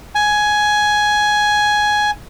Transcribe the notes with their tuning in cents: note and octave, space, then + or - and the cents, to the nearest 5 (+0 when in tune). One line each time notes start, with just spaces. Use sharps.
G#5 +10